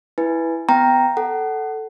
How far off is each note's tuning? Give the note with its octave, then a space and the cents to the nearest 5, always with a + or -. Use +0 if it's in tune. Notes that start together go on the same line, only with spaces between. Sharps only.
E4 +0 B4 +0 G#5 +0
B3 +25 G5 +0 A#5 +0
A4 +0 F#5 +25